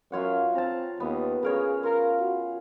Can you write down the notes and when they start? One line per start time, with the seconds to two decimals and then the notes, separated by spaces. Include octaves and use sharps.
0.12 F#2 F4 C#5 F#5
0.55 C4 A5 A#5
1.00 D#2 B3
1.43 C#3 G#4 A#4 C#5
1.84 F4 A#4
2.19 F#4